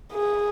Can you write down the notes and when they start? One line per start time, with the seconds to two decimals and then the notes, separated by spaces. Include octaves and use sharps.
0.13 G#4